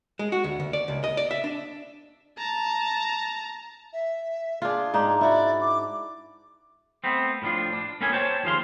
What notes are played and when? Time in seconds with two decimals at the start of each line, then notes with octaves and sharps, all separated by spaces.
0.19 G#3
0.32 F#4
0.44 D2
0.60 D2
0.73 D5
0.88 C#2
1.04 D#5
1.17 D5
1.31 E5
1.44 D4
2.38 A5 A#5
3.93 E5
4.62 D4 F4 G#4
4.94 G#2 D4 D#4
5.21 E4 F#4 D5
5.60 D6
7.04 A3 B3 C4
7.42 A2 F3 D4 F4
7.73 D4
8.01 A#3 B3 C#4 A4 G#5
8.12 C5 C#5 G5 A5
8.44 D#2 F3 G#4 F5 C6